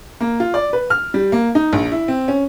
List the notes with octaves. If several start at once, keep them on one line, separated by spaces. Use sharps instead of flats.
A#3
F4
D5
B4
F6
G3
A#3
D#4
A#1
E4
C4
C#4